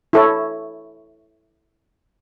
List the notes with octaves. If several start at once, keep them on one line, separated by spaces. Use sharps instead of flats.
E4 A4 C#5